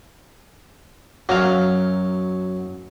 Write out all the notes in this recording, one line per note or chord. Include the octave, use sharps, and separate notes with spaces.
F#2 F#3 F5